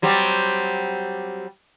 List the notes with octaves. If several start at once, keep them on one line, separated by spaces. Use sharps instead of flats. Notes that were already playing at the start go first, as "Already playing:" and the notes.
F#3 G3 C4